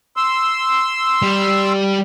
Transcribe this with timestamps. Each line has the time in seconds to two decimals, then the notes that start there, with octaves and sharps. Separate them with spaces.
0.17 C6 E6
1.23 G3